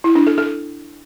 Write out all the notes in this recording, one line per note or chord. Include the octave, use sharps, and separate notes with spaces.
E4
D4
A4
A4